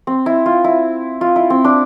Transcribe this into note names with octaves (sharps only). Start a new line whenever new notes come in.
C4
E4
F4
E4
F4
E4
C4
D4